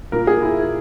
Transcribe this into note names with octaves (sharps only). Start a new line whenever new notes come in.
A#2 A#4
G#4
E4